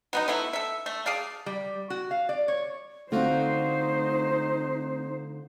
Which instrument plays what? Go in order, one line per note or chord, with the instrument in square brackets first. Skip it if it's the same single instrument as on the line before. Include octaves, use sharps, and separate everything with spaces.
[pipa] F#3 B3 D#4
A3 B3 E4
A4 E5
A3
G#4 D5 F5 A5
[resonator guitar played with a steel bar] G3
F#4
F5
D5
C#5
[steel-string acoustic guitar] D3 F4 F#4 [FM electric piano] A3 C4 [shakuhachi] D#4 [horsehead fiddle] C5